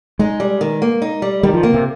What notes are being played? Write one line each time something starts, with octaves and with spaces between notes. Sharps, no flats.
G#3 D#4
G3
D#3
A#3
D#4
G3
D#3 G3
F3
C3 A#3
C3